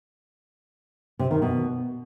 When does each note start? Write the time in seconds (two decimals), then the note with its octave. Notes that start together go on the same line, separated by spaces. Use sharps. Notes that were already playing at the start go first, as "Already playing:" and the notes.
1.19 C3
1.31 D#3
1.42 B2